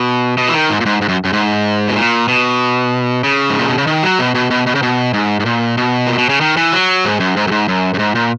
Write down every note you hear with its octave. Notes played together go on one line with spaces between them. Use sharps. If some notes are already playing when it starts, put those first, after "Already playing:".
Already playing: B2
B2
E3
D#3
G#2
A#2
G#2
G#2
F#2
F#2
G#2
B2
A#2
B2
C#3
G#2
A#2
B2
C#3
D#3
F#3
B2
B2
B2
B2
C#3
B2
G#2
G#2
A#2
B2
A#2
B2
C#3
D#3
E3
F#3
G#2
F#2
G#2
F#2
G#2
F#2
F#2
G#2
A#2